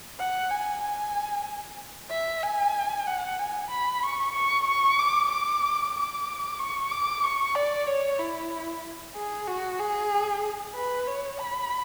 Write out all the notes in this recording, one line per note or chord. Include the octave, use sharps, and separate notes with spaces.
F#5
G#5
G#5
E5
G#5
F#5
G#5
B5
C#6
C#6
C#6
D6
D6
D6
C#6
D6
C#6
D5
C#5
E4
G#4
F#4
G#4
B4
C#5
B5